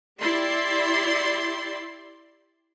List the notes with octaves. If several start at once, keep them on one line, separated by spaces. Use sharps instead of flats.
E4 G4 D5 C6